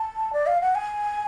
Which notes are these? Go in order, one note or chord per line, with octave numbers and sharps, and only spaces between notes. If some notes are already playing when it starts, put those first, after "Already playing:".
Already playing: A5
D5
F5
F#5
G#5